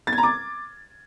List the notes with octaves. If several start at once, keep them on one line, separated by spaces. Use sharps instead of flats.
A6
G#6
A#5
D6